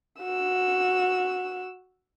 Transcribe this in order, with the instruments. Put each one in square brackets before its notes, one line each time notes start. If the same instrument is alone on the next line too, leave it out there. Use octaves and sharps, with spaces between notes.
[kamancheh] F#4 E6